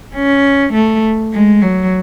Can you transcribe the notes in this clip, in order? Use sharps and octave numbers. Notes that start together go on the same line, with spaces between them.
C#4
A3
G#3
F#3